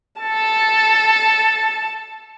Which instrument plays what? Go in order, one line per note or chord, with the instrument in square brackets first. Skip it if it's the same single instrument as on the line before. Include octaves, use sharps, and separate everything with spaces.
[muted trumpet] A4 [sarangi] A5